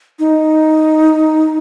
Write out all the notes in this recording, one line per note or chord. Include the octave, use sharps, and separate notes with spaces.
D#4